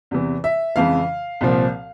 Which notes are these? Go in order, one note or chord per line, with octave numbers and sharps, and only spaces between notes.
E2 C3 E3
E5
F2 C#3 E3 G#3 F5
C2 A#2 F3 C4